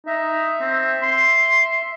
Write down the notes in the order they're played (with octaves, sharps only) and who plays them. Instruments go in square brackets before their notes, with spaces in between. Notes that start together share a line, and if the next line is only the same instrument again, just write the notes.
[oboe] D#4 [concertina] E5
[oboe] C4
C6